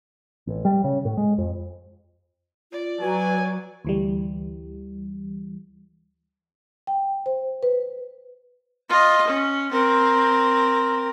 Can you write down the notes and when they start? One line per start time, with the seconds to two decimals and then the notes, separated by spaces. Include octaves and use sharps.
0.47 A1
0.65 G3
0.84 C#3
1.05 A2
1.17 G#3
1.38 F2
2.72 F4 D5
3.01 F#3 B4 G#5
3.85 D2 E3 G3
6.87 G5
7.26 C5
7.63 B4
8.89 F4 D#5
9.28 C#4
9.71 C4 A#4